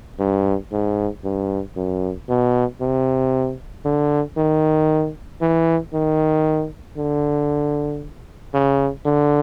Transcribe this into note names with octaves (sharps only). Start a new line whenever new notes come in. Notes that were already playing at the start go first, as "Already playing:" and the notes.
G2
G#2
G2
F#2
B2
C3
D3
D#3
E3
D#3
D3
C#3
D3